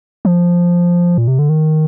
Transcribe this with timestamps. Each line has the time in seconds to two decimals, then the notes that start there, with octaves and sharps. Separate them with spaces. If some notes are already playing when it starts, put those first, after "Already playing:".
0.25 F3
1.18 A#2
1.28 C3
1.39 D3
1.49 D#3